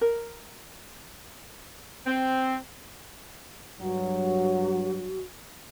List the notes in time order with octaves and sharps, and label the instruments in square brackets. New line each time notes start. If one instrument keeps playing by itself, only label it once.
[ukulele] A#4
[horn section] C4
[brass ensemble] G2 F#3 [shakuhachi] F#4